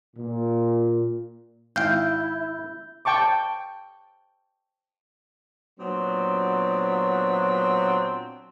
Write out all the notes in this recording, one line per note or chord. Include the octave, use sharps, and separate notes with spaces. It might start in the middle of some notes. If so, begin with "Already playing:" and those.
A#2
G#1 E4 F5 G5 G6
G5 A5 C#6 D6
A#2 F#3 B3 C4 D4